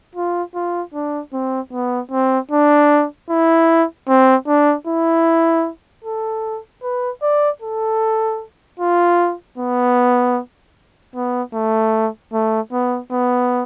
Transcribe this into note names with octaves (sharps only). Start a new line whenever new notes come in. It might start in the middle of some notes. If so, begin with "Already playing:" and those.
F4
F4
D4
C4
B3
C4
D4
E4
C4
D4
E4
A4
B4
D5
A4
F4
B3
B3
A3
A3
B3
B3